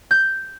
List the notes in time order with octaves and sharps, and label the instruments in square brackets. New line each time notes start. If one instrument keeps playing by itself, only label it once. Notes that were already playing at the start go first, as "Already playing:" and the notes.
[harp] G6